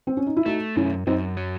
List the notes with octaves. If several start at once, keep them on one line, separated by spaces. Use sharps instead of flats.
C4
C#4
D#4
E4
A3 D#4 F#4
F#2 C#4 E4
F#2 C4 D#4
F#3